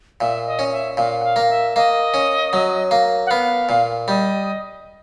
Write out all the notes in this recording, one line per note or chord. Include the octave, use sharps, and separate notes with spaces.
A#2 E5
D#5
C#4
E5
A#2 F5
F#5
F5
A#3
E5
A#3 D#5
C#4
F#3
A#3
F#5
B3 F5
A#2
G3 D#5